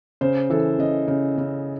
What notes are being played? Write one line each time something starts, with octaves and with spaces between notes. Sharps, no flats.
C#3 C5
E3 A4
C#3 D#5
C#3
C#3